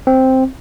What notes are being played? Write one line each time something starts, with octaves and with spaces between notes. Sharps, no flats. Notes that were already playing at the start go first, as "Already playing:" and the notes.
C4